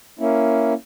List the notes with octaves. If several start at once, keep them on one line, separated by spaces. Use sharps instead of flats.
A#3 C#4 E4